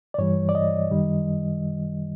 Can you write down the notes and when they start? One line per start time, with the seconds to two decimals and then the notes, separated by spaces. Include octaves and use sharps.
0.14 D5
0.18 G2 E3 G3 C#5
0.49 D5
0.55 D#5
0.91 F#2 D#3 G3